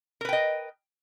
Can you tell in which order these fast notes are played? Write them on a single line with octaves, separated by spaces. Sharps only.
A#4 B4 G5 D#5